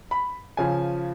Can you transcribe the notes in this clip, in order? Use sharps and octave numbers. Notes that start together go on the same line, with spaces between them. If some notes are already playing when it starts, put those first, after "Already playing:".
B5
C#3 F3 G#5